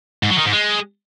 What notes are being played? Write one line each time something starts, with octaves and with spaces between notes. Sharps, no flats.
G#2
F#3
D#3
G#2
G#3